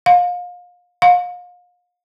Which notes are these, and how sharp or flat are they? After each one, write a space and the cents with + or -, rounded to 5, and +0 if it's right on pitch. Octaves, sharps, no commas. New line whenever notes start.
F5 +30
F5 +35